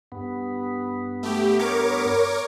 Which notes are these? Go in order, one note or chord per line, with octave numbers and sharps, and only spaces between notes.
G2 B3
A3 G4
A#4 C#5 D6